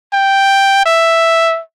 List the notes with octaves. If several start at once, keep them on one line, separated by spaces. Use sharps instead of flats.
G5
E5